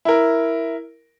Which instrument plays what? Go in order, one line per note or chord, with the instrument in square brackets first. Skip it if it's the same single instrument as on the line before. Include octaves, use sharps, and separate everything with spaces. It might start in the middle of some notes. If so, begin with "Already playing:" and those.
[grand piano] E4 A#4